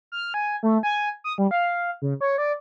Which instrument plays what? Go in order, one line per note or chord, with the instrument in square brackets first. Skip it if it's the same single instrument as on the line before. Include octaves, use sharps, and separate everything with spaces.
[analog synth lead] F6
G#5
A3
G#5
D#6
G3
F5
C#3
C#5
D5